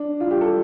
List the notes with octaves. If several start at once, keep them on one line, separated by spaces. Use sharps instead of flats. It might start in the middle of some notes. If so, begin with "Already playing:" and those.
Already playing: D4
F4
G4
A4